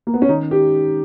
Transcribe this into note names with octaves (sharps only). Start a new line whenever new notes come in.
A#3
B3
C#4
D#3 D#4
G4